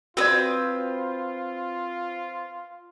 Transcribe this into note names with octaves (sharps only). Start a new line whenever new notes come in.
C4 F4 F#4 B4 D5 D#6